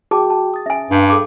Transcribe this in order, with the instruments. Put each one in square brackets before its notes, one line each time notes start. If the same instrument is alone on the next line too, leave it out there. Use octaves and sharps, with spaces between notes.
[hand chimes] F#4 G5 [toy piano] G#4 A5 D6
[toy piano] A5
[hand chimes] D#6 A6
[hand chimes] C#4 [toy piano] E5 G#5
[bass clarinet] G2 [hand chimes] D4 F5
[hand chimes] G#4 [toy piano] A4 D6